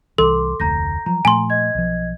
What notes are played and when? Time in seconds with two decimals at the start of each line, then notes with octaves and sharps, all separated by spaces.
0.18 C2 E3 A4 C6 D6
0.60 F1 D2 A#5 G6 A#6
1.06 F3 F#3 A#5
1.25 A#2 F3 A3 G#5 C6
1.50 D#5 G#6
1.75 B1 F3